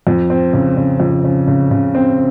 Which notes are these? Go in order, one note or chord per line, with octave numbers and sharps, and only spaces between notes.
F2
C4
C#3
C#3
F2
C#3
C#3
C#3
C4